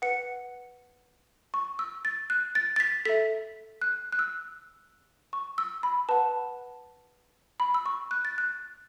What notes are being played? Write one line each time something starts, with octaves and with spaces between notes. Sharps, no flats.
B4 F#5 C#7
C#6
E6
A6
F#6
A6
A6
B6
A4 E5 B6
F#6
F#6
E6
C#6
E6
B5
B4 F#5 A5
B5
E6
C#6
F#6
A6
F#6